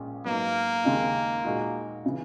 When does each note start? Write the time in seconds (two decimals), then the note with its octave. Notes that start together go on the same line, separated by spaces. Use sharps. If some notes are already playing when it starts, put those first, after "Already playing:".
Already playing: A#1 A#2 G#3 C#4
0.24 G#2 F#3 A#3 B3
0.84 D#2 C#3 G#3 D#4
1.44 A#2 G#3 D#4 F#4
2.06 C#3 E3